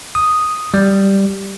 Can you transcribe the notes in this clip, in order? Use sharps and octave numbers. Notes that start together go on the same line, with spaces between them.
D#6
G3